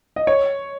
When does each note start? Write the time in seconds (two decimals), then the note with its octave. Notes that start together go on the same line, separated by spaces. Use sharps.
0.16 D#5
0.27 C#5